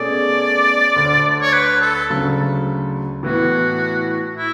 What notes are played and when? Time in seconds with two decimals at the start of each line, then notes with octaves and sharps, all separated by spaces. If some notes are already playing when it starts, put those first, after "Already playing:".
Already playing: B2 A3 C#4 G#4 D5
0.96 D2 D3 A3
1.41 C#5
1.53 B4
1.81 A4
2.10 D2 C#3 F#3 A3
3.23 A2 E3 B3 E4 F#4
4.36 E4